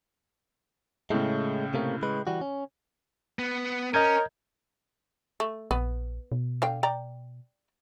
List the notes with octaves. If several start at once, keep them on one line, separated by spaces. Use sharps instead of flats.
A2 C#3 G#3 A3
C3 A3 A#3
G#3 B4
E3 G3 F#4
C#4
B3
C#4 A#4 D#5 G6 G#6
A3
A#1 B3
B2
D3 F5 G5
D5 G5 A#5